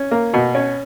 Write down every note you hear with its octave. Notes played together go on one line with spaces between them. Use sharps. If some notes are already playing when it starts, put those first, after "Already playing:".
Already playing: C#4
A#3
B2
C#4